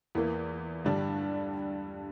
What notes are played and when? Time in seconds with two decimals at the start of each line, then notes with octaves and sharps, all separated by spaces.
0.15 E2 E3 A#3
0.85 G2 D3 G3 D4